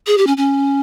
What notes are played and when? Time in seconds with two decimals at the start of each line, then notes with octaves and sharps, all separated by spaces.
0.07 G#4
0.18 G4
0.27 C#4
0.37 C#4